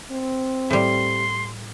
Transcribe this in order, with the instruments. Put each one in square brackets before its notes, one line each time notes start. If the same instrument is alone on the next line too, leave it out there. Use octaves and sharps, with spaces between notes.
[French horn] C4
[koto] A2 G3 [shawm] C6